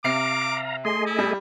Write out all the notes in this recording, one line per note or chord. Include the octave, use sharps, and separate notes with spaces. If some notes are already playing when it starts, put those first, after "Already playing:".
C3 F5 A#5 D6 C7
A3 G#4 D#5 C6
E4
G3